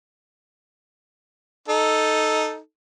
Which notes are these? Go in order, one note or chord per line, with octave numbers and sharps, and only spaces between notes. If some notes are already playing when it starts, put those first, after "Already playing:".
D#4 A4